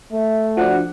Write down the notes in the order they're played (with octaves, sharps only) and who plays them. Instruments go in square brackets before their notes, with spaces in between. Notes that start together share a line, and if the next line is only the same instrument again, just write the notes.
[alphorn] A3 [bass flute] E5
[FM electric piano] F3 D4 [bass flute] F#4 [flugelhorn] F#5